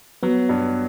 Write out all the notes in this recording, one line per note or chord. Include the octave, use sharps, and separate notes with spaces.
F#3 B3
G2